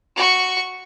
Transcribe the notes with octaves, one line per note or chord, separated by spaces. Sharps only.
F#4 C#6